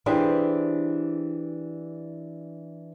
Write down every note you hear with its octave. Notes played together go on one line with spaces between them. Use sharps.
E3 D4 G4 G#4 C5